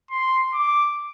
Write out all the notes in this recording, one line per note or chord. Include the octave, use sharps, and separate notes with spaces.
C6
D6